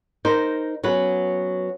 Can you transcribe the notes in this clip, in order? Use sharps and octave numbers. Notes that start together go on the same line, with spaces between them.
D#4 A#4 C5
F#3 B3 C#4 B4